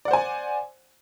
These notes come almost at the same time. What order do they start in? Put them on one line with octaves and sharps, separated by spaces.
D5 F#5 C5 G#5